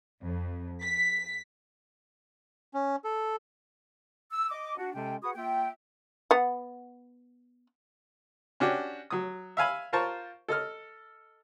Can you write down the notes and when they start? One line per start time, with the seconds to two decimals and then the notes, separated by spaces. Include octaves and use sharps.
0.23 F2
0.82 B6
2.74 C#4
3.04 A4
4.32 E6
4.51 D#5 D6
4.78 D4 F#4
4.95 C3 G#3 C#4 A4 G5
5.23 F#4 G#4 B4 F#5 B5 D#6
5.36 A#3 F4 E5 G5
6.31 B3 F#5
8.60 C#4 D4 F#4 G4
9.10 F#3 D#6
9.57 E5 F5 G#5 B5
9.93 F4 A#4 C5 A5 C#6
10.49 A4 D#5 F6